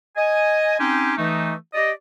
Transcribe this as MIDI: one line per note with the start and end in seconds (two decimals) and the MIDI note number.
0.17 0.75 75
0.17 0.75 80
0.79 1.14 60
0.79 1.14 61
0.79 1.14 63
0.79 1.14 67
0.79 1.14 80
0.79 1.14 84
1.18 1.53 52
1.18 1.53 57
1.18 1.53 63
1.74 1.91 67
1.74 1.91 74
1.74 1.91 75